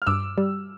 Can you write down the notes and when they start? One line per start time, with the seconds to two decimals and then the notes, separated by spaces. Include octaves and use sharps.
0.02 F6
0.07 G2 D6 E6
0.38 G3